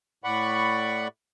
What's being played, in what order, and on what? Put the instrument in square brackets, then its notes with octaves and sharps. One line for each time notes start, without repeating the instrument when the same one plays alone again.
[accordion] A2 D5 F#5 B5 C#6